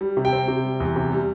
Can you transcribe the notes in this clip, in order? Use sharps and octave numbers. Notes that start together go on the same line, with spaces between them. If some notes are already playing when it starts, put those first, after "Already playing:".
G3
C3
G5
C4
C3
G3
E2
C3
G3